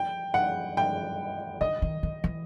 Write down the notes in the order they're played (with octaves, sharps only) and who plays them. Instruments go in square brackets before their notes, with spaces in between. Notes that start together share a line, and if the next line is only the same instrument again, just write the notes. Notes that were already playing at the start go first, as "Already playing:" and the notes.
Already playing: [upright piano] G5
F#5
G5
[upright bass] D3 [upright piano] D#5
[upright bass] D#3
D#3
E3